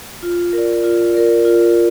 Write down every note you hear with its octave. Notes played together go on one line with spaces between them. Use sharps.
F4
A#4 D5
F4
A#4 D5
F4